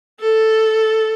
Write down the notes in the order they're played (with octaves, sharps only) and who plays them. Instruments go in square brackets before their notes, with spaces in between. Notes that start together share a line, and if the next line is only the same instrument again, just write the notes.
[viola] A4